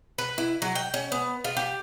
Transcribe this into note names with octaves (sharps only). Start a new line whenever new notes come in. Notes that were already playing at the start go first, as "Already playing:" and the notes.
B4
E4
F#3
G5
C#4
B3
F4
G4